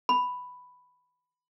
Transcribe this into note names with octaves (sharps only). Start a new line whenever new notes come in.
B5